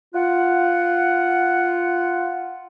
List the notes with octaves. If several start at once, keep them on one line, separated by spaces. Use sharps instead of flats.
F4 F#5